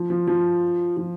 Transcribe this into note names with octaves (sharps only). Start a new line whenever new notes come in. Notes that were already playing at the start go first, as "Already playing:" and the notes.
Already playing: F3
F3
F3
F3